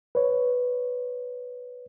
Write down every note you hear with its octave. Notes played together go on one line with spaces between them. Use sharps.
B4 C#5